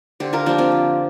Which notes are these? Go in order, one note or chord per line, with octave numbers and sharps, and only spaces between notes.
D3 G4 C5
F4 A#4
F3 A#3 D4 G4
C4 F4
D3